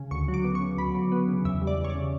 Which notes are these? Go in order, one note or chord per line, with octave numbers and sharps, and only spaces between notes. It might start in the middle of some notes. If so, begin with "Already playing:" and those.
Already playing: C#3
D2 C#6
F#3
D6
B3
C#6
C#3
D2 B5
F#3
B3
C#3
E2 E5
G3
D5
E2
C#5
D5
C#3